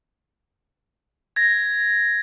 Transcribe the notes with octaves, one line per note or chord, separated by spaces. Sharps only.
G#6 A#6